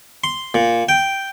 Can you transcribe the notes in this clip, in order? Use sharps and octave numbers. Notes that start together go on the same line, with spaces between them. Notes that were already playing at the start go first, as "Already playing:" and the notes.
C6
A#2
G5